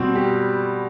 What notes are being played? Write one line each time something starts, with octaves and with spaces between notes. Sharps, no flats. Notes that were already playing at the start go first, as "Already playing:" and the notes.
Already playing: B2 G3 C4
G4